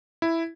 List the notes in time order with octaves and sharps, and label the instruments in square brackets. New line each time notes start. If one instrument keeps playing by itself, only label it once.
[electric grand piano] E4